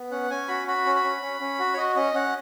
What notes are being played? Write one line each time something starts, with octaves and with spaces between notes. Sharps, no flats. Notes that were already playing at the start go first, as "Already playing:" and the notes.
Already playing: B3
C#4 F#5
C#4 G#5
F#4 B5
F#4 B5
C#4
B5
C#4
C#4
C#4
F#4
C#5
F#4 D#5
C#4 D#5
C#4 F#5